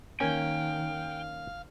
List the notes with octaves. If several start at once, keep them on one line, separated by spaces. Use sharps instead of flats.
D#3 A#3 C#4 F5 G5 G#5